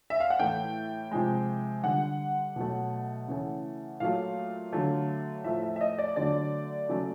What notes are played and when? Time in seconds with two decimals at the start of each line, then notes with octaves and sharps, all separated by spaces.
0.10 E5
0.20 F5
0.30 F#5
0.39 A2 E3 A3 G5
1.11 C3 F3 G#3
1.84 D3 G3 F#5
2.56 B2 F#3 A3
3.28 C#3 E3 A3
4.00 A#2 F#3 A3 F5
4.73 D3 F#3 A3
5.44 A2 F3 A3 E5
5.63 E5
5.76 E5
5.81 D#5
5.98 D5
6.16 D3 F#3 A3 D5
6.89 C#3 F#3 A3